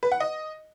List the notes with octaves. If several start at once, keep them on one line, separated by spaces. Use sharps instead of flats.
B4
F#5
D#5